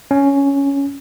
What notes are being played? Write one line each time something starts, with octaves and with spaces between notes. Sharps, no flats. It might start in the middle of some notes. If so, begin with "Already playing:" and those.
C#4